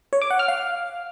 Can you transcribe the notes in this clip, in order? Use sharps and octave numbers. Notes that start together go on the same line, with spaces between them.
C#5
D6
F#5
F6
F5